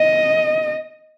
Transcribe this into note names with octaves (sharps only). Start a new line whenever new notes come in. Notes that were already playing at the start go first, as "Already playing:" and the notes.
Already playing: D#5